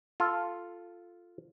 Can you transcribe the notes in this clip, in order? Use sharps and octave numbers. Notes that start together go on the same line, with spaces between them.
F4 A4